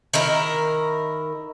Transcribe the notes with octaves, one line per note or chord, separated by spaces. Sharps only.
D#3 E4 A#4